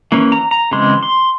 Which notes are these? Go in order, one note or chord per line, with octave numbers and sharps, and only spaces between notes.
E3 A#3 C#4
A#5
A#5
C#3 E3 G#3 C4 C6
C6